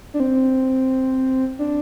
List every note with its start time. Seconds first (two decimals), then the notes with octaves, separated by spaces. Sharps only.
0.14 D4
0.20 C4
1.59 D4